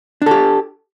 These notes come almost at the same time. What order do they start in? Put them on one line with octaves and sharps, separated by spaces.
D4 A4 G4